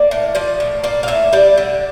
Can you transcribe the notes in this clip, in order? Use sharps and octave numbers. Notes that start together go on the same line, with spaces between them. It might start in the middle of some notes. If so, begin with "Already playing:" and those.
Already playing: A#3 D5
A2
F3 D5
A2
A#3 D5
F5
A2 E5
G3 D5
D3